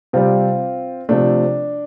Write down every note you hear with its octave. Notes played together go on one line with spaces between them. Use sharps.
C3 G3 C4 F4
C3 F3 A3 D4